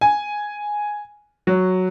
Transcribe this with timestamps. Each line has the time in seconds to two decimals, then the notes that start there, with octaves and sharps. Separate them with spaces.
0.01 G#5
1.47 F#3